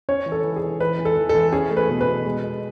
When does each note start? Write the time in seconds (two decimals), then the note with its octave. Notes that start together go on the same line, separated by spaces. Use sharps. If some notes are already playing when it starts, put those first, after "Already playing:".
0.09 C#4 C#5
0.26 E3
0.32 A4
0.44 E3
0.56 G#4
0.63 E3
0.80 E3 B4
0.99 E3
1.05 A4
1.17 E3
1.29 A4
1.35 E3
1.52 C#4 G#4
1.70 A3
1.77 B4
1.89 B2
2.01 B4
2.07 B2
2.26 G#3
2.43 G#3